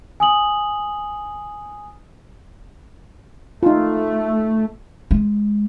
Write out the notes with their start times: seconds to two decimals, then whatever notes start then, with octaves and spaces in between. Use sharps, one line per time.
0.20 G#5 D#6 F#7
3.63 A3 D#4 F4
5.11 G#3